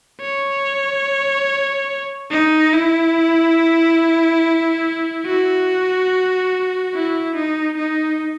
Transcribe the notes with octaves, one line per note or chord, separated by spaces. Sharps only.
C#5
D#4
E4
F#4
E4
D#4
D#4